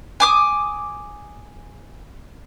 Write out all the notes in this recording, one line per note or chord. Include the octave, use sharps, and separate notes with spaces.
G#5 D6 D#6